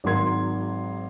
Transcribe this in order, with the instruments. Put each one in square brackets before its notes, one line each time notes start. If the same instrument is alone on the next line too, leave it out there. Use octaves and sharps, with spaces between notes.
[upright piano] G#1 G#2 F#3 A#4 C6 G#6